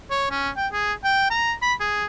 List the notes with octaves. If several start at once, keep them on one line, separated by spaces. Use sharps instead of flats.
C#5
C#4
G5
G#4
G5
A#5
B5
G#4